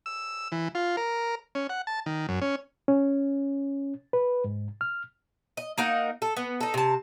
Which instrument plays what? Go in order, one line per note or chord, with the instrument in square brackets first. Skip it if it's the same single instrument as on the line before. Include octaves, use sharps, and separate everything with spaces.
[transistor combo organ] E6
E3
F4
A#4
C#4
F#5
A5
D#3
F#2
C#4
[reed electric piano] C#4
B4
G#2
F6
[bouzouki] D#5
A#3 D#4 A#4 F#5
A4
B3
D#4 A4
C3 A5